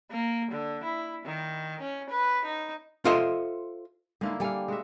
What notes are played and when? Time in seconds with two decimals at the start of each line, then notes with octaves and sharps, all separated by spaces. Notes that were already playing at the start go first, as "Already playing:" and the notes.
0.11 A#3
0.51 D3
0.83 E4
1.25 D#3
1.81 C#4
2.10 B4
2.45 D#4
3.05 F4 A4 C5 D#5 E5
4.21 D3 G#3 A#3 D#4 E4
4.40 G3 A4 F5 G5 G#5
4.68 G#3 F#4 E5